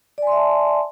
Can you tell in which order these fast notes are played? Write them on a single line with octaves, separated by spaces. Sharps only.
D5 G#5 C6 E5 A5